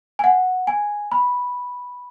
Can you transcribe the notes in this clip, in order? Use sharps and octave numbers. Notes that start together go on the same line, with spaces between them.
G#5
F#5
G#5
B5